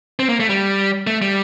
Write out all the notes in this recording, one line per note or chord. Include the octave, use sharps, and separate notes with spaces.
C4
A#3
A3
G3
A3
G3